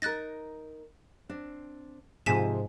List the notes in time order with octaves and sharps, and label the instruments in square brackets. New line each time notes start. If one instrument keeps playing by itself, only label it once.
[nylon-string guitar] D#4 A#4 [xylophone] F#6 A6 A#6
[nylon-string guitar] C4 D4
[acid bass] G#2 [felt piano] C3 F3 [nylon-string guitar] G#4 C5 [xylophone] G#5 B6 E7